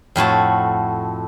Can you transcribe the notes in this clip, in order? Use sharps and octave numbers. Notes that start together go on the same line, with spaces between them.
F2 A2 F#4 A5